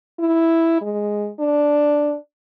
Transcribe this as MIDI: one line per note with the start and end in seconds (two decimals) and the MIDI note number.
0.19 0.80 64
0.81 1.29 56
1.39 2.15 62